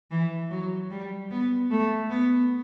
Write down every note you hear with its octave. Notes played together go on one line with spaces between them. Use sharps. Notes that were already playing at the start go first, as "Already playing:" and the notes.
E3
F#3
G3
B3
A3
B3